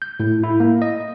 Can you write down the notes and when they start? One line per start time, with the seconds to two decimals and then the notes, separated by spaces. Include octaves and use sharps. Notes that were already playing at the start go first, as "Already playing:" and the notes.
0.02 G6
0.20 A2
0.43 E4
0.60 A#3
0.82 D#5